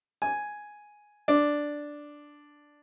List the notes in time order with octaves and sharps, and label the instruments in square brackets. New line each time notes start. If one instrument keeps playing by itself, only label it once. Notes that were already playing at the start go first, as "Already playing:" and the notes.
[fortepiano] G#5
D4